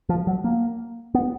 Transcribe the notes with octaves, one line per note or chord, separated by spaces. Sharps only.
F3
F#3
A#3
B3